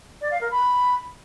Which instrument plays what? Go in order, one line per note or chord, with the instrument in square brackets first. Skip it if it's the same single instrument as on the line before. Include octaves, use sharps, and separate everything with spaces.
[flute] D5
F5
A#4
B5